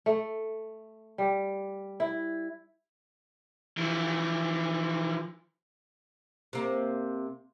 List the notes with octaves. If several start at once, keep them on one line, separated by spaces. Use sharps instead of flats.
A3
G3
E4
E3 F3
C3 A#3